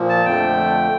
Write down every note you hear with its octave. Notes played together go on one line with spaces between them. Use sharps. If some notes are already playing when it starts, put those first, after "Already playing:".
Already playing: A#2 F3
A5
F2 D3 A3 G5